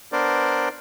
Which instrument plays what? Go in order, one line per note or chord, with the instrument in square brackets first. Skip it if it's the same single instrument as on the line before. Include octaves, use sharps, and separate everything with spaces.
[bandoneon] B3 D4 A#4 C5 D5